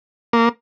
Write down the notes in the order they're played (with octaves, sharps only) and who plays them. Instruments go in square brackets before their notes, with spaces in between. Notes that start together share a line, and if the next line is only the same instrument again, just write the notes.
[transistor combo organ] A#3